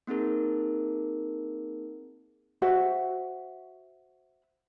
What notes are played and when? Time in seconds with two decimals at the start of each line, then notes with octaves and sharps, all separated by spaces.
0.07 A#3 C4 D#4 G#4 A#4
2.62 F#4 C5 E5 F#5